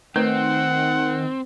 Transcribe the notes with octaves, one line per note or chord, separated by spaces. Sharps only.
D#3 A3 C4 B4 F#5